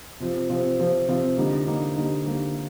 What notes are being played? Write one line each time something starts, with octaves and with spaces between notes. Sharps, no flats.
C3 F3 C4 F4
C3 F3 C4 F4
C3 F3 C4 F4
C3 F3 C4 F4
D3 G3 A#3 D#4
D3 G3 A#3 D#4
D3 G3 A#3 D#4
D3 G3 A#3 D#4